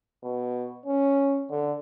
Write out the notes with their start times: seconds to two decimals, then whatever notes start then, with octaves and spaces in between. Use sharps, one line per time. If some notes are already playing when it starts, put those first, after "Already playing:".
0.23 B2
0.86 C#4
1.50 D3